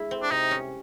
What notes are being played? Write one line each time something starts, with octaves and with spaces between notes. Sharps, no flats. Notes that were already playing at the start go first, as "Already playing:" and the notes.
Already playing: G#3 E4
C4
D4
C3 D#4
C#4